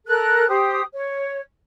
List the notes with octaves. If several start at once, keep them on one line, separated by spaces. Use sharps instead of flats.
A4 A#4 F#6
G4 C5 D#6
C#5